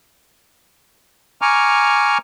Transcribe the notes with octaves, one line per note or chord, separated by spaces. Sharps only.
G#5 A#5 C#6 D6 F6